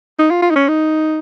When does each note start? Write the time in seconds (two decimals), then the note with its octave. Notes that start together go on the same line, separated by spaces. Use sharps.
0.19 D#4
0.31 F4
0.42 F4
0.50 D#4
0.56 C#4
0.68 D#4